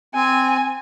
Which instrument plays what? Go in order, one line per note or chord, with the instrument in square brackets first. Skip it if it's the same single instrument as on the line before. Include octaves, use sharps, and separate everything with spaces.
[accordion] C4 [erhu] G#5